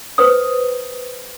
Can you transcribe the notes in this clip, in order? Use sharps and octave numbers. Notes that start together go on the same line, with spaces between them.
B4 C5 D#6